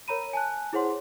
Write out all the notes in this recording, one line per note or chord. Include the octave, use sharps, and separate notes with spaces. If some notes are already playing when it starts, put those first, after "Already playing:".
A#4 C#5 A#5 B5 D#7
G#5 A5 F#6
E4 G#4 C5 C#5 F#5 C6